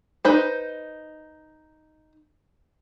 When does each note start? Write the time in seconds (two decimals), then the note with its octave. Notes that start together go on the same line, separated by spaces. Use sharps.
0.25 D#4 B4 C5